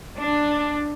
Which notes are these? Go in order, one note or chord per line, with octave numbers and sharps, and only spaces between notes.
D4